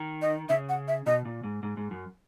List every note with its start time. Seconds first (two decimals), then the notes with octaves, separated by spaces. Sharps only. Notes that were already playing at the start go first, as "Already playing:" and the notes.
Already playing: D#3
0.22 D#5
0.49 C#3 E5
0.69 F#5
0.88 E5
1.06 B2 D#5
1.25 A#2
1.43 G#2
1.63 G#2
1.77 G#2
1.91 F#2